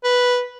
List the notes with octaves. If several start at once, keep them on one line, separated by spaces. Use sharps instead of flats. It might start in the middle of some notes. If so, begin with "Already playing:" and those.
B4